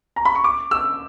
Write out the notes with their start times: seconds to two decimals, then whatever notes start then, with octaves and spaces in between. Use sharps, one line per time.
0.16 A#5
0.25 B5
0.35 C#6
0.44 D6
0.71 E6